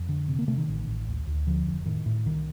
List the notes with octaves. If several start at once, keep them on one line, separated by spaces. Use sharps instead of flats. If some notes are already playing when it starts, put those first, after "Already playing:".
Already playing: F2
D3
C3
A#3
C3 A3
D#3
A1
A1
D2
D2
D3 F3
F1
A2 D#3
A2
C2 D#3